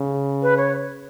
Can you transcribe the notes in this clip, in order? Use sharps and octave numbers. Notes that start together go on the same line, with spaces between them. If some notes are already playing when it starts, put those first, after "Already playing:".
Already playing: C#3
B4
C#5